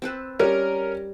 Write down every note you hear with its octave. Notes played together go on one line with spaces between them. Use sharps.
C4 A4 B4
G3 C#4 A#4